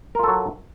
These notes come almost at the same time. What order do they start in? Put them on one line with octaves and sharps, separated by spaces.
A#4 F4 A4 F#3